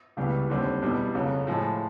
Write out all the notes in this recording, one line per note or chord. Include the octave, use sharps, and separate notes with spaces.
C#2 C#3 E3 G3 B3
D#2 D3 G3 C4
E2 B2 G3
F2 C#3 F#3
A2 F3 G#3